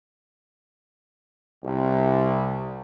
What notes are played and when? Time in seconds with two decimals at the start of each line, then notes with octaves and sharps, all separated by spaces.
1.64 C2